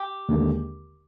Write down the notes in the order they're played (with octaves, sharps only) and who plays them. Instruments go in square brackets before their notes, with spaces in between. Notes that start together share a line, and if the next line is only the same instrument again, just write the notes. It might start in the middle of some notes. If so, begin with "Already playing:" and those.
Already playing: [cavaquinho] G4
[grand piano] D#2 D3 G#3